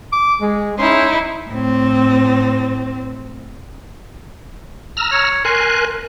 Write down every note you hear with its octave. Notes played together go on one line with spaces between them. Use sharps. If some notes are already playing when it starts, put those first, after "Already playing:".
D6
G#3 G#4
C#4 D#4 E4 C6
A2 C4
A#5 E6 F6
C#5
A#4 G#5 C6 F#6